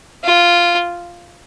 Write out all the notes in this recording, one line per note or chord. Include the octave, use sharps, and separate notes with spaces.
F4